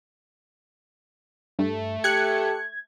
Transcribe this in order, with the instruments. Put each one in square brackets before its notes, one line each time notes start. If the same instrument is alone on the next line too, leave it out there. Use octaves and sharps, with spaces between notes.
[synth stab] G2 [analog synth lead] A3
[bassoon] G4 [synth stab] F#6 C#7 [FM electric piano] G#6